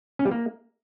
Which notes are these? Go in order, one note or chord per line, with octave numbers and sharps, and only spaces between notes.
C#4
G3
A#3